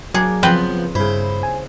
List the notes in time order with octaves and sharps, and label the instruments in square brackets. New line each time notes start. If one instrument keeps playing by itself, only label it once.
[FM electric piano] F#3 [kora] A#3 D4 [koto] G#4
[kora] C#3 C5 [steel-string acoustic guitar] F3 B3 [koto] C4 B4 G5
[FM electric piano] G2 B5 [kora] C#3 E4 [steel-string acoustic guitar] C5
[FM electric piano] G#5